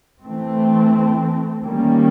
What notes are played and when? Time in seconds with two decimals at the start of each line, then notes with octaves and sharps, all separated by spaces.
0.23 E3 A3 C4
1.63 D#3 G3 A#3 C#4